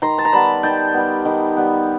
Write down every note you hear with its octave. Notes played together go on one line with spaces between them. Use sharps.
D#3 A#5 C6
A5
A#5
G3 B3 A5 B5
D#3 G5 A5
G3 B3
D#3
G3 B3